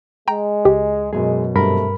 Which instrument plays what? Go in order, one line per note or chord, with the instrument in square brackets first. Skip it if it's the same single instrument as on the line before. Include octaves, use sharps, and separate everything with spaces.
[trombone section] G#3 [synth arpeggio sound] G5 A#5
[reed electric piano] C#2 [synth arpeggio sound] G4
[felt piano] F#2 B2 F#3 [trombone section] G#3 [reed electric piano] G#4
[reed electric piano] G2 A#4 B5 [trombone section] C3 A3